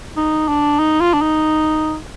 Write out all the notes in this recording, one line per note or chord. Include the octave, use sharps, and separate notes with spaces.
D#4
D4
D#4
F4
D4
D#4